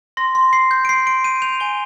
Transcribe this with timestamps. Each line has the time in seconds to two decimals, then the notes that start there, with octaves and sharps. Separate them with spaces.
0.17 C6 A#6
0.35 C6
0.53 C6 C7
0.71 G6
0.85 D7
0.89 C6 C7
1.06 C6 D7
1.24 G6 D#7
1.42 G6 F7
1.60 G#5 G7